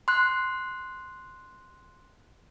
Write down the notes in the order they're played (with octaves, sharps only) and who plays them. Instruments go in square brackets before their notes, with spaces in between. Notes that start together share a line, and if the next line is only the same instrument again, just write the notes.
[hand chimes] C6 F#6